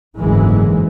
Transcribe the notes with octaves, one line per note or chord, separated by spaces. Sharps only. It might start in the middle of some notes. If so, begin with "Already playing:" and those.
F#1 D2 G#2 E3 F#3 G#3